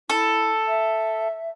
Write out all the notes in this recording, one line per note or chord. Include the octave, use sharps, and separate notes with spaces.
E4 A4
E5